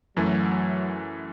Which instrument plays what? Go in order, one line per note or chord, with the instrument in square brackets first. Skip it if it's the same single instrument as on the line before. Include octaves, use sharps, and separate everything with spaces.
[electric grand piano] F#2 E3 A3 [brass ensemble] F#3